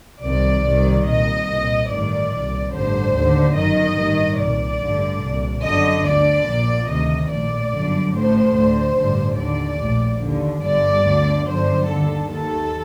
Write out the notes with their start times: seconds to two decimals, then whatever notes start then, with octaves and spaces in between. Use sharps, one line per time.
0.22 C2 C3 D#3 D5
0.64 C2 C3 D#3
1.06 C2 A#2 D#5
1.47 C2 A#2
1.89 A1 G2 D#3 D5
2.31 C2 A#2
2.72 A1 G2 D3 C5
3.14 D#2 D3
3.55 G1 F#2 D#3 D#5
3.97 A1 G2 D#3
4.38 C2 A#2 D5
4.80 A1 G2 D3
5.22 C2 A#2
5.64 G1 F#2 D3 D#5
6.05 D2 D3 D5
6.46 A#1 A#2
6.88 D2 C3 D#3 D#5
7.30 A#1 A2 D5
7.71 G1 F#2 D3
8.14 A1 A2 C5
8.55 D2 D3
8.96 A1 G2 D3
9.38 D#2 D3 D5
9.79 A#1 A2
10.21 D#2 D3
10.62 G1 G2 D3 D5
11.04 D2 D3
11.46 G1 F#2 D3 C5
11.88 D#2 D3 A4
12.29 D#2 D#3 A4